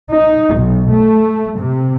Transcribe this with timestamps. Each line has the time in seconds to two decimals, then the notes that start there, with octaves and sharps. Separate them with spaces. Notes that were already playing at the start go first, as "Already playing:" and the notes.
0.10 D#4
0.55 B1
0.90 A3
1.57 C3